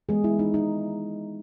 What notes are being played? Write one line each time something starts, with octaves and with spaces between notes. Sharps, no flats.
E3 G#3 B3 G#4
E4
D#4
D#4